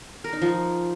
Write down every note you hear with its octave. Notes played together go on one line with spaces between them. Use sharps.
A#4
D#4
F3